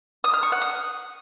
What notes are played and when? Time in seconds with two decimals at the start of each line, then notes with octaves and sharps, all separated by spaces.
0.24 D#6
0.33 F6
0.43 C#6
0.52 F#5
0.61 D#6